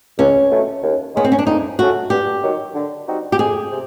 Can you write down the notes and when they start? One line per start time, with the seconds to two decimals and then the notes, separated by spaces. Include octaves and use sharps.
0.18 C#2 C#4
0.50 B2 F#3 A3
0.82 D#2
1.14 D#3 G#3 B3 C#4
1.25 C4
1.32 C#4
1.39 D4
1.46 F2 D#4
1.78 C#3 F#3 A3 C#4 F#4
2.10 G2 G4
2.43 D#3 F#3
2.75 D3
3.07 G3 C4 D#4 F#4
3.32 G4
3.39 F2 G#4
3.71 C3